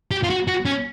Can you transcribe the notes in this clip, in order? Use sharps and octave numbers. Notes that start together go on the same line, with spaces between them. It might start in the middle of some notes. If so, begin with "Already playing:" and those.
G4
F4
F#4
F#4
C#4